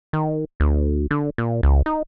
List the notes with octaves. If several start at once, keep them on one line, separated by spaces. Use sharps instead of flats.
D#3
D2
D3
A#2
C#2
D#4